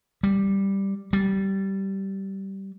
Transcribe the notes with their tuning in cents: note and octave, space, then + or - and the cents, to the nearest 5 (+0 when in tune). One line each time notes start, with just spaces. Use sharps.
G3 +0
G3 -15